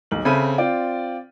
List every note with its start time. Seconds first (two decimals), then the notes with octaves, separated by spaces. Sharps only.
0.11 D#1 B1 F#7
0.25 C#3 C4 A4 E5 B5 D#7
0.58 C4 F4 D5 G5